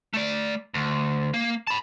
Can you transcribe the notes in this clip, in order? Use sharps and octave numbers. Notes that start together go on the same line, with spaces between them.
A3 D5
D2
A#3
A5 B5